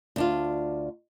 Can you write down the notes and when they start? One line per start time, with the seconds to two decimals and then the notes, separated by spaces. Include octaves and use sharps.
0.16 D2 D4 F4